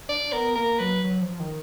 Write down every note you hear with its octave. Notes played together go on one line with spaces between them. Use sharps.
D4 D5
B3 A#4
A#3 A#4
F#3 B4
F#3
F3
D#3